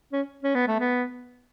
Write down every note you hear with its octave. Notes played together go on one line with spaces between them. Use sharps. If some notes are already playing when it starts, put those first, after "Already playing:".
C#4
C#4
B3
A3
B3